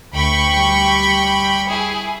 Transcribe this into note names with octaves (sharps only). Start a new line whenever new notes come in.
D2 G5 B5 C#6
G3
E4 G#4